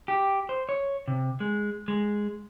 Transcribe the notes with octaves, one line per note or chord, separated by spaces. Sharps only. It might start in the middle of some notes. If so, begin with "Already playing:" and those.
G4
C5
C#5
C3
G#3
G#3